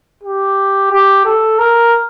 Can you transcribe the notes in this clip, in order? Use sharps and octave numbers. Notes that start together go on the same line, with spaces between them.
G4
G4
A4
A#4